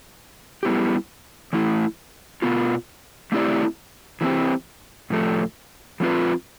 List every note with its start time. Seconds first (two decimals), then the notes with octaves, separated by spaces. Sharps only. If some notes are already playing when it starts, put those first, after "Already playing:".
0.63 G3 B3 E4 G4
1.53 E3 A3 E4
2.42 B2 B3 F4
3.32 A3 C4 E4 G4 D5
4.21 E3 G3 C4 G4
5.10 A2 F3 A3
6.00 F3 A3 C4 F4 B4